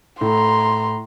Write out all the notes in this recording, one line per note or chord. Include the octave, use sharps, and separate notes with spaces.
A2 A#5 C6